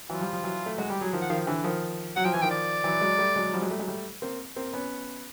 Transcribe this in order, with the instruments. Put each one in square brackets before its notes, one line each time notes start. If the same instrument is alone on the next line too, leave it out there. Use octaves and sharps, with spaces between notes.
[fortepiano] E3 F#3 [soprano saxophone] F4
[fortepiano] F3 G3
F3 G3
E3 F#3
A3
[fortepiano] G#3 [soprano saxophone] F#4
[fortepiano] G3 [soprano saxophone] G4
[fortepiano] F#3 [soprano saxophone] G#4
[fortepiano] D#3 F3
[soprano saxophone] F#5
[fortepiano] D#3 F3 [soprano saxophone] F5
[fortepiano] D3 E3
D#3 F3
[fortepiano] F#3 [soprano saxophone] F#5
[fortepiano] F3 [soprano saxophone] G5
[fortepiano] E3 [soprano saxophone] G#5
[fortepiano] D#3 F3 [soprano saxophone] G5
[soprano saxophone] D5
[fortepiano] E3 F#3
F#3 G#3
G3 A3
F#3 G#3
F#3
F3 G3
F#3 G#3
G3 A3
F#3 G#3
G3 A3
A#3 C4
A#3 C4
B3 C#4